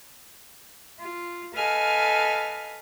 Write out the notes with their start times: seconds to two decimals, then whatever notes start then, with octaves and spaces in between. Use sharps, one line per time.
0.99 F4
1.53 A4 B4 D#5 F5 G#5 F6